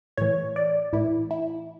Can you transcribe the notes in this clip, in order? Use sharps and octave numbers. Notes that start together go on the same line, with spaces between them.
A2 E3 C#5
D5
A2 E3 E4
E4